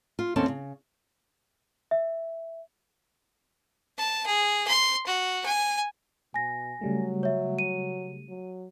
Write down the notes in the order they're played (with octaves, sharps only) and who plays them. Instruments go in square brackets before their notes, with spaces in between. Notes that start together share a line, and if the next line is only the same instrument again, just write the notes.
[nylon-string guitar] F4
D#2 C4 C#4 A4 A5
C#3
[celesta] E5
[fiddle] A5
G#4
C6
F#4
G#5
[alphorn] B2 [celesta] G#5 A#6
[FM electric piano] C#3 G3 A3 [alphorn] F#3
[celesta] C#5 E5
D#7
[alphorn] F#3